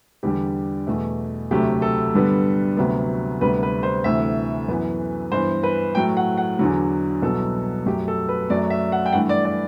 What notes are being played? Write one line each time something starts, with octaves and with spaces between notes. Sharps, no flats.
E2 D3 G3 G4
E2 B2 A3
D2 C3 F#3 A3 G4
A4
G2 D3 G3 B3
D2 C3 F#3 B3
D2 C3 G3 B3 B4
B4
C5
D2 C3 E3 A3 E5
F#2 E3 B3
G2 E3 B3 C5
B4
A2 F#3 A3 G5
F#5
F#5
E2 D3 F#3
C2 B2 F#3 B3 A4
F#2 F#3 A3 G4
A4
B4
F#2 F#3 A3 D5
E5
F#5
G5
G2 E3 A3 F#5
D5
D5